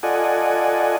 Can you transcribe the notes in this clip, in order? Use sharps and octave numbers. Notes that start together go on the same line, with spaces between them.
F4 A4 D5 D#5 F#5 G#5